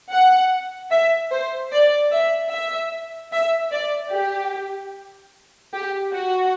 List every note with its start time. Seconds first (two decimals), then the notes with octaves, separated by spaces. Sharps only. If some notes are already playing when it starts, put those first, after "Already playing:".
0.12 F#5
0.91 E5
1.31 C5
1.72 D5
2.11 E5
2.52 E5
3.32 E5
3.72 D5
4.12 G4
5.73 G4
6.13 F#4